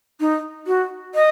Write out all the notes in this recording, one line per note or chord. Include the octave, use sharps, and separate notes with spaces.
D#4
F#4
D#5